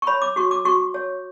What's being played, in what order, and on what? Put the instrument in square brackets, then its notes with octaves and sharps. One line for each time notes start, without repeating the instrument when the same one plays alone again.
[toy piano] C#6
C#5 B5
D6
F#4 C#6
D6
F#4 C#6
C#5